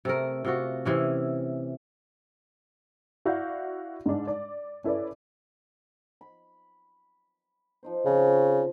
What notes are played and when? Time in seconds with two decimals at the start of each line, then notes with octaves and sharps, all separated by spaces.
0.05 C3 A3 A#4
0.45 C3 F4 F#4
0.85 C3 E3 C#4
3.25 E4 F#4 D5 F5 F#5 G6
4.06 G#2 G#3 D4
4.27 D5
4.84 C#4 E4 A4 B4 D5
6.21 B5
7.83 F3 D#4 C5
8.06 C#3 F3 C4 F#4